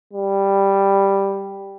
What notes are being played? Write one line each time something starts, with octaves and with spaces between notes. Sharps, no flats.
G3